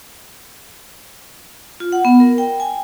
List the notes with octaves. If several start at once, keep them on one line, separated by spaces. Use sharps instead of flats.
F4
F#5
B3
A#4
G5
G#5